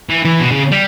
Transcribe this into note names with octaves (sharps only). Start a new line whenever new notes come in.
E3
E3
B2
C#3
G3